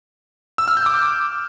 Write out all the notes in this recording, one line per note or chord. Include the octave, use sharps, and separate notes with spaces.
E6
F6
G6
D6